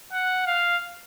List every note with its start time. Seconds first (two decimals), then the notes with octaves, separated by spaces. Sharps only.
0.12 F#5
0.46 F5